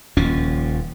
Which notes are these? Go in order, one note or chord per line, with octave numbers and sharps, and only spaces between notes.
D#1 D#2 F3 C#4